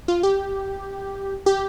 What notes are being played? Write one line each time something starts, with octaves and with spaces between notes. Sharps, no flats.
F4
G4
G4